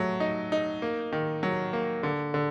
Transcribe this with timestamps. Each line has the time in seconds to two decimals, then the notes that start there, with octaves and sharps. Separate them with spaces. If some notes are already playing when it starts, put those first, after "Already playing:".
Already playing: F#3 A3
0.20 D#4
0.52 D#4
0.82 A#3
1.12 D#3
1.43 F#3
1.73 A#3
2.03 D3
2.34 D3